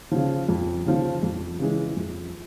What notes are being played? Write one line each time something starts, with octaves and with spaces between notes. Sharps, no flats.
C#3 F3
F2
C#3 F3
F2
C#3 E3 G#3
F2